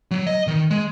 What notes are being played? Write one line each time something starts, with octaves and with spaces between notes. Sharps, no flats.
F#3
D#5
D#3
G#3